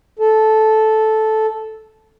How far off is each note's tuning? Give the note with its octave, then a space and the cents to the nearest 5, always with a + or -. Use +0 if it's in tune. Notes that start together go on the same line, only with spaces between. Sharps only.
A4 -10